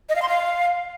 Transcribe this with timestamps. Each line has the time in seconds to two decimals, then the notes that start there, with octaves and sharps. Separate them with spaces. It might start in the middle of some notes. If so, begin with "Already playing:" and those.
0.09 D#5
0.16 F5
0.22 C6
0.29 F5